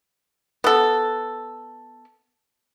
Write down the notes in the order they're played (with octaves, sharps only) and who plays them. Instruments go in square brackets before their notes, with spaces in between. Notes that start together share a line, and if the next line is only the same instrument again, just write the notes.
[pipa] B3 A4